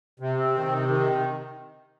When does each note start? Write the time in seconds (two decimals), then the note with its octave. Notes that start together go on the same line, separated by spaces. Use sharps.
0.20 C3
0.38 C4
0.55 D#3
0.72 C3
0.89 D#3